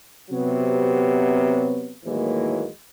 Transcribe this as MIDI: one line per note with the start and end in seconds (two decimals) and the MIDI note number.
0.31 1.92 48
0.31 1.92 54
0.31 1.92 59
2.04 2.66 39
2.04 2.66 45
2.04 2.66 52
2.04 2.66 54
2.04 2.66 56
2.04 2.66 58